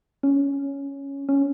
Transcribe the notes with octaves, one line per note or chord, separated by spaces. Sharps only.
C#4
C#4